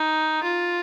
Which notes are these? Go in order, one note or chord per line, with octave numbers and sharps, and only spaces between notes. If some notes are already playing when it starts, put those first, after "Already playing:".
Already playing: D#4
F4